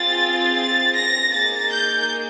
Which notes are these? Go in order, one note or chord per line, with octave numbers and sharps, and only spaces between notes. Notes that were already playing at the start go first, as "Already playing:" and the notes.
Already playing: C4 F4 G#4 A6
A6
A#6
A#3 D#4 G#4 A6
G6